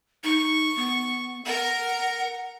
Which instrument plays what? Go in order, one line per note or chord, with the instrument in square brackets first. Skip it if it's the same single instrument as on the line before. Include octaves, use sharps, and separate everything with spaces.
[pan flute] D#4 [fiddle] C#6
[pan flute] B3
[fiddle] A#4 A#5 [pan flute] F#5